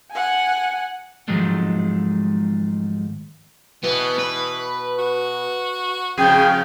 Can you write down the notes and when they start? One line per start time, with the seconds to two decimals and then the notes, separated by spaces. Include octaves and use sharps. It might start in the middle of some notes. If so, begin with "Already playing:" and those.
0.11 F#5 G#5
1.28 G#2 D#3 F3 F#3 G#3 A3
3.84 B2 E3 B3
4.19 B4
4.99 F#4
6.18 F2 G#2 C#3 G#4 G5